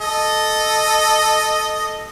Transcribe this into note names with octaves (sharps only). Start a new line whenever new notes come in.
A4 D#5